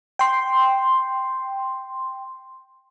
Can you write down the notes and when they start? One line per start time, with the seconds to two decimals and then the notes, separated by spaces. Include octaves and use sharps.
0.19 G5 C6